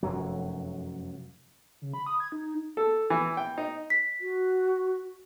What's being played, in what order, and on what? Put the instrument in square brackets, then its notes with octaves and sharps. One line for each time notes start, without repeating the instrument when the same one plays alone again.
[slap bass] F1 F#2 F#3
[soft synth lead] C#3
B5
D#6
G#6
D#4
[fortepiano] A4
E3
G5
D#4
[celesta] B6
[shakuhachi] F#4